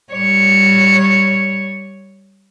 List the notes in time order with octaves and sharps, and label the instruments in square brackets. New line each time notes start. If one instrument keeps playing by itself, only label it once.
[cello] G3 C#5